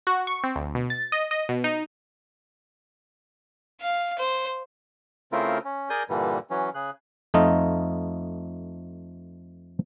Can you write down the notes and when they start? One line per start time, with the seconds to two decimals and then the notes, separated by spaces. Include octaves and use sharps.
0.07 F#4
0.27 C#6
0.44 C4
0.56 D2
0.75 B2
0.90 A6
1.12 D#5
1.31 D#5
1.49 B2
1.64 D#4
3.81 F5
4.19 C5
5.32 C#3 A3 C4 E4 F4 A#4
5.65 C#4
5.90 G#4 A#4 D5 G#5 D#6 G6
6.09 G2 A#2 D3 E3 G3
6.50 E3 F#3 C#4
6.74 C#3 G#4 F#6
7.34 F2 A3 D#4 F4 D#5